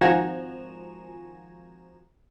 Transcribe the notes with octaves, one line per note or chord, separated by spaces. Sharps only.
G#1 F3 F#4 G#5 A#5 E7